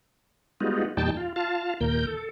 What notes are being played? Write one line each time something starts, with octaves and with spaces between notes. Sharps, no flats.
G3 G#3 B3 D#4 F4 F#4
E2 A#2 G3 D#4 G5 A5
F4
F4 F5 A5
D#2 A#2 A#4 G6
A4